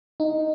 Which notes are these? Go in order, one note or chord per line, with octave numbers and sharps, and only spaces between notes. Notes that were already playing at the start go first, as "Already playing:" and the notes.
D#4